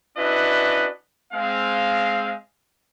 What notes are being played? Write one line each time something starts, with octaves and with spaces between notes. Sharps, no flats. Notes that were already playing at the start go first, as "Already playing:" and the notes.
C#4 D4 E4 F#4 B4 D#5
G#3 C4 F5